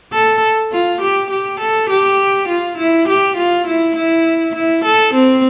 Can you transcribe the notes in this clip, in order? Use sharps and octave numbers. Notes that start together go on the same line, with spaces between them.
A4
F4
G4
G4
A4
G4
F4
E4
G4
F4
E4
E4
E4
A4
C4